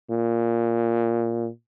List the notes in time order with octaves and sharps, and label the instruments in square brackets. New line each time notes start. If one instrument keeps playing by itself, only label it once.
[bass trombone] A#2